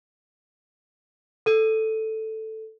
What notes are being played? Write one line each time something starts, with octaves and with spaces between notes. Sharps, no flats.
A4 D#7